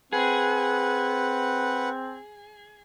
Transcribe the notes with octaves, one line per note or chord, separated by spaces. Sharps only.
C4 G#4 B4 F#5